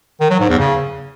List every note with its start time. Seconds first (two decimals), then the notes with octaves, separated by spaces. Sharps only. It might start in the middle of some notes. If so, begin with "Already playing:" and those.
0.20 D#3
0.30 F#3
0.40 G#2
0.49 E2
0.59 C#3